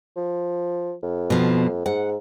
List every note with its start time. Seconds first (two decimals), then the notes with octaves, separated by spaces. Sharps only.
0.17 F3
1.03 F2
1.30 B2 F3
1.86 G#2 F#5